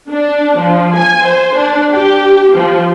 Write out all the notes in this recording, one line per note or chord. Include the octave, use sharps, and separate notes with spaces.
D4
F3
G#5
C5
D4
G4
F3